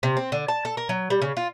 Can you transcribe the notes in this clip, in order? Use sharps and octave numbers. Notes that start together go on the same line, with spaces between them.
C3
C4
D3
A5
A4
A#4
F#3
G3
C#3
F4